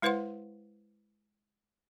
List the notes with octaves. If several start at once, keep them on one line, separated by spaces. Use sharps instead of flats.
G#3 E4 B4 C5 F#5 C6